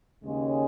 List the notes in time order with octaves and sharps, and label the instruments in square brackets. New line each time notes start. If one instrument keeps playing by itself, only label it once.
[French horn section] D#2 C#3 G#3 C#4